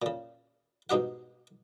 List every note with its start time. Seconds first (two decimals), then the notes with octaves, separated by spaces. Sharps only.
0.02 A#2 C#3
0.90 G#2 B2 D#4 G4 F#5